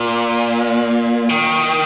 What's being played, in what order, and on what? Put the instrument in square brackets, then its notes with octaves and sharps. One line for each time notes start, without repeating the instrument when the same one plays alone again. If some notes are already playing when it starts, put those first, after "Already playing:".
Already playing: [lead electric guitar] A#2
D#3